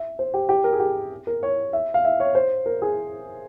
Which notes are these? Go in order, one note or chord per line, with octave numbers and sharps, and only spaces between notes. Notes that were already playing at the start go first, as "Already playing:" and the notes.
Already playing: E5
C5
G4
G4
A#4
G#4
G4
A#4
C#5
E5
F5
E5
C#5
C5
A#4
G#4